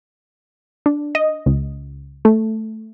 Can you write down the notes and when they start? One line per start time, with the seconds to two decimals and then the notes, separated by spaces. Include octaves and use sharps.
0.86 D4
1.15 D#5
1.46 C#2
2.25 A3